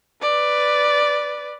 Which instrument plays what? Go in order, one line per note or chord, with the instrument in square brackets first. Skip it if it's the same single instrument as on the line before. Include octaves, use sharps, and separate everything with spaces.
[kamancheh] B4 D5